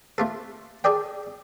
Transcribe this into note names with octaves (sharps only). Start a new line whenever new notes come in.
A3 F4 A4
G#4 A4 D5 G5